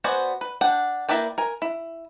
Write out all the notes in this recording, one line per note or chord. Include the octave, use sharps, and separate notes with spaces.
B3 F#4 C5 D5 G#5
B4
D4 F#5 G5
A#3 E4 B4 D5 G5
A#4 G#5
E4